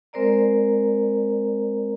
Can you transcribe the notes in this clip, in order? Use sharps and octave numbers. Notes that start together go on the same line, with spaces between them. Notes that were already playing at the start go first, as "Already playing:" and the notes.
G#3 C4 A#4 C5 D5 A#5